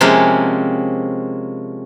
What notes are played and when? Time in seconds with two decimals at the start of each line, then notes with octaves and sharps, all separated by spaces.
0.01 C3 F3 G#3 A#3 C#4